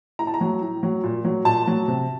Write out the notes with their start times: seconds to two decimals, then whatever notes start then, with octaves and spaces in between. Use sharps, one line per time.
0.19 A2 A#5
0.27 A5
0.34 A#5
0.41 F#3
0.61 A2
0.83 F#3
1.04 A#2
1.25 F#3
1.45 A#2 A5
1.67 F#3
1.88 C3